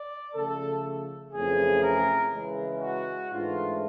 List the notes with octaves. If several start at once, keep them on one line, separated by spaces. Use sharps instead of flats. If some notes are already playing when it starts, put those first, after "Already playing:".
Already playing: D5
C#3 F3 A3 A4
F2 C#3 E3 A3 C#4 G#4
A#4
C#3 E3 G#3
F#4
G#2 E3 A3 D4 F4